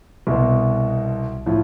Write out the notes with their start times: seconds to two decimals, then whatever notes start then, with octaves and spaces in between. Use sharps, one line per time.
0.27 C2 B2 B3
1.46 A2 F3